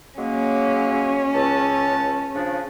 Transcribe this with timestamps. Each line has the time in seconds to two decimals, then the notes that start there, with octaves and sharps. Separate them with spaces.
0.19 F#3 G#3 A#3 C#4
1.34 C#2 A5
2.35 C#3 F3 D4